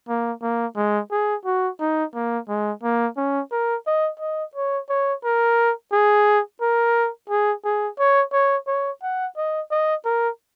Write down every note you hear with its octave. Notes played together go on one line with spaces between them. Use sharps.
A#3
A#3
G#3
G#4
F#4
D#4
A#3
G#3
A#3
C#4
A#4
D#5
D#5
C#5
C#5
A#4
G#4
A#4
G#4
G#4
C#5
C#5
C#5
F#5
D#5
D#5
A#4